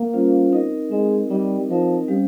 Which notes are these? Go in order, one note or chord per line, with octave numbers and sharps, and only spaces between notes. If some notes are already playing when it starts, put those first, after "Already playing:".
Already playing: A#3
G3 C#4 F4 C5 F5
C4 D#4 A#4 D#5
G#3 C4 D#4 A#4 D#5
G3 C4 D#4 A#4 D#5
F3 C4 D#4 A#4 D#5
G3 C#4 G4 C5 F5